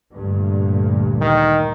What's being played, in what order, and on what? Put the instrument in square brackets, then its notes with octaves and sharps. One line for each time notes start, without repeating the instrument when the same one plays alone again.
[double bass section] D2 G2 A#2
[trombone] D#3